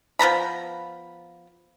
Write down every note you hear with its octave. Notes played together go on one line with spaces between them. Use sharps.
F3 B3 A#5 B5